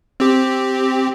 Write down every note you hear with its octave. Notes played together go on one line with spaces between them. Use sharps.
C4 G4